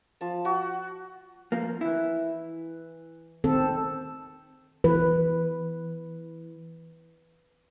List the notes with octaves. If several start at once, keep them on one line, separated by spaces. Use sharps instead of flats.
F3 A5
F#4
F3 A#3
E3 E4
D#3 C4 A4
E3 B4